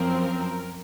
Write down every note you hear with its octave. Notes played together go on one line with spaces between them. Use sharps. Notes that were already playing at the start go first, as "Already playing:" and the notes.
Already playing: F#2 F3 C4 A#4